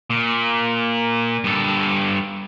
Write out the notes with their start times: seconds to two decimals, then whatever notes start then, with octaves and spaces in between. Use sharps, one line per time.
0.10 A#2
1.44 G2 A4